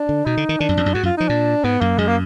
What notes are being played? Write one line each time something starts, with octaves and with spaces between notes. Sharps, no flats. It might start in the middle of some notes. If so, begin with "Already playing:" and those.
Already playing: D4
D3
B2 D#4
D3
D#3
D#3 D4
F#2
F2
F#2
G#2 F#4
F#2
F4
F3 D#4
A#2 D4
G#2 B3
F#2 A#3
F#2 G#3
A#3